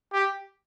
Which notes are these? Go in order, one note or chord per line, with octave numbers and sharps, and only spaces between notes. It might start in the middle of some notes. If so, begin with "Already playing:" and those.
G4